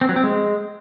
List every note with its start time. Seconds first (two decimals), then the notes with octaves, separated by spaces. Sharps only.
0.01 C4
0.09 F#3
0.16 C4
0.24 G#3